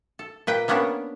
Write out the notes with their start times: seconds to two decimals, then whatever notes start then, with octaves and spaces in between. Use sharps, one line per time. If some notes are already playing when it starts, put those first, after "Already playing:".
0.19 A4
0.47 A#2 B4 G5
0.68 G3 A#3 B3 C#4 D4